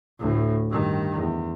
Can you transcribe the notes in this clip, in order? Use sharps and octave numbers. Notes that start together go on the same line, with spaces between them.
D2 A2
G2 D#3
E2